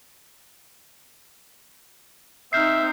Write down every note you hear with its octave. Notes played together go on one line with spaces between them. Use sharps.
C4 D#4 E5 F6 G6 C7